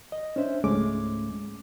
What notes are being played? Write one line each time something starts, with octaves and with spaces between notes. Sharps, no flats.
D#5
C#4 D4 C5 E5
C#2 G#2 G#3 A3 C#4 D6